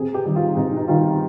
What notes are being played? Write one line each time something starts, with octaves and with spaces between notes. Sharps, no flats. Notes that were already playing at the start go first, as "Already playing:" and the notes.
Already playing: C3 G#4
G4
D#3 G3
F4
C3 D#4
D#4
D#3 G3 F4